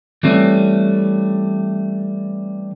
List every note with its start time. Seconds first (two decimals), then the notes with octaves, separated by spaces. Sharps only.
0.23 E3 G3 A3 C4 C#4